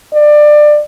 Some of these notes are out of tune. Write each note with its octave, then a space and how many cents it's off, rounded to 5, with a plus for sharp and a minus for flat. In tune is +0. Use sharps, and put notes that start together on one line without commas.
D5 +20